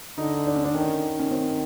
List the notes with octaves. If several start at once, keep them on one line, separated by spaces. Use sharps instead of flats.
D3 D#4
D4
C#4
D4
D#3 C#4
C#4
C4